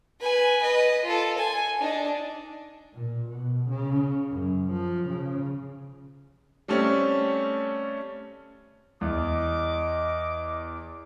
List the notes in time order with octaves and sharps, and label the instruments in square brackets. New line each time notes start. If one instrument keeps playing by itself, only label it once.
[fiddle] B4 G#5
B4 D#5
F4 A4
G#5
D4 D#4
[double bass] A#2
B2
C#3
F#2
F3
C#3
[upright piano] G3 A3 C4 C#4
[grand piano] E2 [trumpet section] D#5 D6